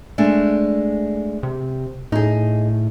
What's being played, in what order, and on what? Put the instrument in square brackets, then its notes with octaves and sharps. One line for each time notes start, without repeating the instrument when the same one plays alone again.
[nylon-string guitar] G#3 A3 D4
[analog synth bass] C3
[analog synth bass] A2 [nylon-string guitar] D#4 G#4